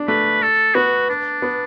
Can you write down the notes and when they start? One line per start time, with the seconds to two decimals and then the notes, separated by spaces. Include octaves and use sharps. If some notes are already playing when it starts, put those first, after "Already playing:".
Already playing: D4
0.08 A3 B4
0.42 A4
0.75 B3 F#4
1.09 D4
1.42 B3